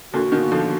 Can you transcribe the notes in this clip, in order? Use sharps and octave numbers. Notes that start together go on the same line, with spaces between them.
A#2 D3 F#4
B2 D#3
A#3
D3 F3
F#4